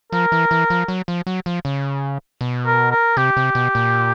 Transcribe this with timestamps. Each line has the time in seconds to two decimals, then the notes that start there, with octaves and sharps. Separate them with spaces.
0.13 F3 A#4
0.32 E3
0.51 E3
0.70 F3
0.88 F#3
1.08 F3
1.27 F#3
1.46 F3
1.65 C#3
2.41 B2
2.66 A#4
2.92 A#4
3.17 C3 G4
3.37 C3
3.55 B2
3.75 A#2